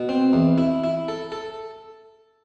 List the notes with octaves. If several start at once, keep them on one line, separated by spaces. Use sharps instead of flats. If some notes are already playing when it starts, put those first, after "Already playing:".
Already playing: B2
C4
E2
E4
E4
A4
A4